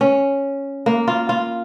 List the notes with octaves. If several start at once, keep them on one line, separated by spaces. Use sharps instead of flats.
C#4
A#3
F4
F4